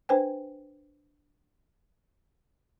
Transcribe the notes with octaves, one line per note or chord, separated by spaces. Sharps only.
D4 B4 C5 G5 G#5